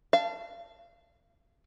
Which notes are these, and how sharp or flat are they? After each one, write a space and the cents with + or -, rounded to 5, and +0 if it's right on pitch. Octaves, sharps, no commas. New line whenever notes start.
F5 -30 A5 +0